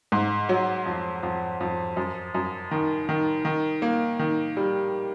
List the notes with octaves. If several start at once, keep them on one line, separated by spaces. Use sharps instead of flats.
G#2
F#3
F2
F2
F2
F#2
F#2
D#3
D#3
D#3
A#3
D#3
G3